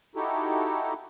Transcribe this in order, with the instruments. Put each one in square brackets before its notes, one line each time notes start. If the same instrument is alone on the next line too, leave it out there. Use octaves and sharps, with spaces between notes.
[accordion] D#4 E4 F#4 G4 A4